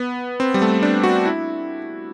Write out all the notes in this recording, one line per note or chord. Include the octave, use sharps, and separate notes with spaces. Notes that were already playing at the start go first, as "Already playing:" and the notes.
Already playing: B3
C4
G3
A3
D4
F#4
E4